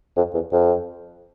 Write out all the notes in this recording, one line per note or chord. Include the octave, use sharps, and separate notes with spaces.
F2
E2
F2